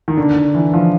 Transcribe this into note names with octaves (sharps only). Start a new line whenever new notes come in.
D#3
D3
D3
E3
F3